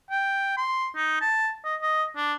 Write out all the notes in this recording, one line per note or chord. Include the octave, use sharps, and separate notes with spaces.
G5
C6
D#4
A5
D#5
D#5
D4